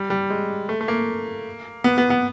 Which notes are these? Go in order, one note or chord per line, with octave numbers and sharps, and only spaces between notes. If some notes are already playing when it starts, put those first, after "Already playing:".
Already playing: G3
G3
G#3
A3
A3
A#3
B3
B3
B3